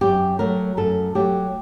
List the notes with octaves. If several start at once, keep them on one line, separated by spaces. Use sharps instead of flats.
F#2 G4
F#3 A3 A#4
F#2 A4
F#3 A3 G4